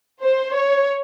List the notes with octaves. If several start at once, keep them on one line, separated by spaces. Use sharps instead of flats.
C5
C#5